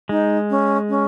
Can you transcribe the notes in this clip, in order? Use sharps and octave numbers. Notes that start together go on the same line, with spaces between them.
G#3 D#4
C#4
C#4